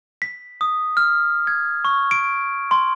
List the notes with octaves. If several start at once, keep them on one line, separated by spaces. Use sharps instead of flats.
B6
D#6
F6
G#6
C#6
D7
C6